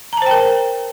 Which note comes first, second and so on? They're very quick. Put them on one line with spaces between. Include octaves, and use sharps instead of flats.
A#5 A5 C5 G5 A#4